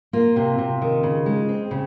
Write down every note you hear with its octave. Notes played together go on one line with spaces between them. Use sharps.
A#3 F4
C3
C3
D#3
C#3
G#3
C4
C#3